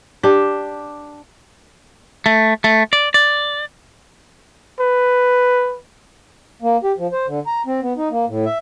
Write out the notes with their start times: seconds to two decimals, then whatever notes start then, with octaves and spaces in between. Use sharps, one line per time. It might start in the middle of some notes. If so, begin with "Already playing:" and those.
0.23 D4 G4
2.26 A3
2.64 A3
2.93 D5
3.14 D5
4.80 B4
6.62 A#3
6.84 G4
6.98 F3
7.12 C5
7.27 D3
7.47 A#5
7.66 C4
7.82 B3
7.97 D#4
8.11 A#3
8.27 A2
8.46 E5